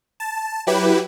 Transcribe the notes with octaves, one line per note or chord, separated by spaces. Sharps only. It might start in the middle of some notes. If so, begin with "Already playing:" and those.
A5
F#3 E4 G4 B4